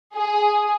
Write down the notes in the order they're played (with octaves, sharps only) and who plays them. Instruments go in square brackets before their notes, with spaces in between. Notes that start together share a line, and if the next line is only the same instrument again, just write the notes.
[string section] G#4